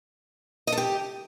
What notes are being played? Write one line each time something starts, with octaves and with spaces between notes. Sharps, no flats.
D#5
A4
G4